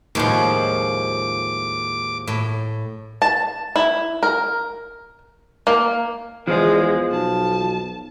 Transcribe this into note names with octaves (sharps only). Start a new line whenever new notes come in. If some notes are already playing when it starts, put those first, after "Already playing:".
D#2 A2 F3 G#3 C#5 D6
A2
A5
E4
A#4
A#3
E2 F3 G#3
B1 A5